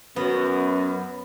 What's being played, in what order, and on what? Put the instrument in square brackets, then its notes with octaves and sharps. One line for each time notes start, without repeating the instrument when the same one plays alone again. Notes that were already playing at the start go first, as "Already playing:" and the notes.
[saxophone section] F#2 [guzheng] B3